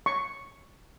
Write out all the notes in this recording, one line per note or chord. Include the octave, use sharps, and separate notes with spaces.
C#6